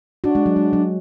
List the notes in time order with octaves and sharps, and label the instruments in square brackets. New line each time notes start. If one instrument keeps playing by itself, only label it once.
[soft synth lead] D4 [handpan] F#4
[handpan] G#3
F#3
G#3
F#3